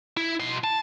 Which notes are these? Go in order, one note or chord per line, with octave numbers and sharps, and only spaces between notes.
E4
B2 C6
A5